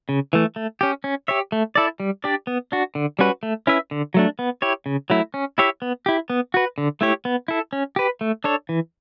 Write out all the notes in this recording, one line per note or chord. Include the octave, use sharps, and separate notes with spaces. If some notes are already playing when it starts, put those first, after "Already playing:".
C#3
E3 A3
A3
C#4 G4
C#4
G4 C#5 E5
A3
E4 A4 D5
G3
D4 G4 D5
B3
D4 F#4
D3
G3 C#4 F#4 B4
A3
C#4 E4 B4 E5
D3
F#3 A3 D4
B3
E4 G4 C#5
C#3
F#3 A3 E4
C#4
E4 G4 C#5 E5
B3
E4 G4
B3
F#4 B4
D3
A3 E4 G4 C#5
B3
E4 A4
C#4
G4 B4
A3
D4 A4 C#5
E3